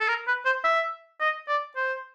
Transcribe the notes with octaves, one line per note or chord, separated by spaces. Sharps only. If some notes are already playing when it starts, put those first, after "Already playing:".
A4
A#4
B4
C5
E5
D#5
D5
C5